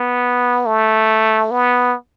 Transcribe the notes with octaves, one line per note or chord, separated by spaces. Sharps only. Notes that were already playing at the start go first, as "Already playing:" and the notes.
Already playing: B3
A3
B3